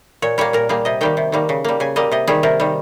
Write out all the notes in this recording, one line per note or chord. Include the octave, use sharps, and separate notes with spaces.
A#2 C#5
G3 A#3 C#5
A#2 A#4
G3 A#3 G#4
C3 D#5
D#3 G3 A#3 G5
C3
D#3 G3 A#3
C#3
G3 A#3
C#3 G#5
G3 A#3 D#5
C3 D#5
D#3 G3 G#4
C3 A#4
D#3 G3